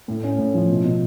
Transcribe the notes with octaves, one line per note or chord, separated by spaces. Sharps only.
A2
C#4
A2
F3
B2
B2